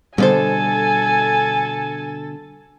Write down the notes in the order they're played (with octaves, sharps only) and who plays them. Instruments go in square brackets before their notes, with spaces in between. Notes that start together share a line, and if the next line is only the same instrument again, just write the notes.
[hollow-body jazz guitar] B2 D3 C5 [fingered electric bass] G3 [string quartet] A4 [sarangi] G#5